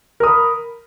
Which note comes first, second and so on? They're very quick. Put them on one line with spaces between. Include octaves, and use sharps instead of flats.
A#4 D#6 B5